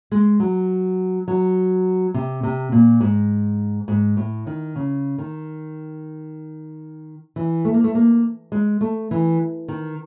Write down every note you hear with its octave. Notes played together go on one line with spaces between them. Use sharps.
G#3
F#3
F#3
C3
C3
A#2
G#2
G#2
A2
D#3
C#3
D#3
E3
A3
A#3
A3
A#3
G#3
A3
E3
D#3